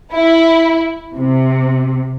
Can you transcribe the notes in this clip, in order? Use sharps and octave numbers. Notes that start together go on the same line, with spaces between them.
E4
C3